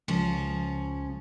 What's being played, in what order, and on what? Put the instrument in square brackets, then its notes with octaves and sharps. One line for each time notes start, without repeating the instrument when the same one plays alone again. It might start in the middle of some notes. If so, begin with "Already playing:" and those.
[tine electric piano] C#2 [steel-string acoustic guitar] F3 C#4